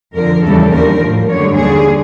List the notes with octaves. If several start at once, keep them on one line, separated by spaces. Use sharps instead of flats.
F2 D3 F3 A#4
E2 C#3 E3 G3 A4
D#2 D3 G3 A#4
A2 F3
F#2 D3 G3 C#5
D#2 D3 G3 G#4